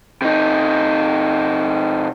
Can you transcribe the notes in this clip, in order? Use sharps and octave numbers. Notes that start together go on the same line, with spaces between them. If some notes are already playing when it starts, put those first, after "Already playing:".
C3 D#4